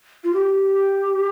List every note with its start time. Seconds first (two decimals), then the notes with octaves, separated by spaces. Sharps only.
0.24 F4
0.33 G4